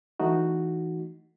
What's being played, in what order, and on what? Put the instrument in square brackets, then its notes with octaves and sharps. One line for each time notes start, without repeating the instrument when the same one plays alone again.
[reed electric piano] E3 A3 D#4 F#4